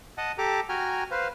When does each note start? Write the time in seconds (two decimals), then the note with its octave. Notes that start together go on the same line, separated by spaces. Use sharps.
0.18 D#5 F#5 A5
0.38 G4 A4 A#5 D6
0.69 F#4 G5 G#5 A#5 F6
1.11 B4 C5 F5